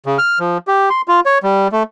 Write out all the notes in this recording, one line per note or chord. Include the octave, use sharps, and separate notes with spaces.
C#3
F6
F3
G4
C6
F4
C#5
G3
A3